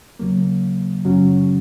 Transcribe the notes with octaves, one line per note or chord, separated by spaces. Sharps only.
D#2 C#3 F#3 A#3
F#2 C#3 F#3 C#4 F#4